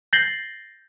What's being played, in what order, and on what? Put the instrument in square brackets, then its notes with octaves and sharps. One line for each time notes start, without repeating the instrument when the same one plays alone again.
[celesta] G6 A6 A#6 C7 F#7 G7